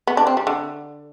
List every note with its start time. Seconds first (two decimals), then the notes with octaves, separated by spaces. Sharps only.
0.07 B3
0.17 D4
0.27 C4
0.37 G3
0.47 D3